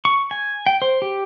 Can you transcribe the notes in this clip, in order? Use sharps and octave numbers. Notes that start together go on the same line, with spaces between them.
C#6
G#5
G5
C5
G4